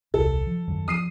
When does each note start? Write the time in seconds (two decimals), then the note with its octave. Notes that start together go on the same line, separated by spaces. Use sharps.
0.14 D#1 C2 A4
0.47 F3
0.68 F#2 D#3 F#3
0.88 F3 D#6 C7 D#7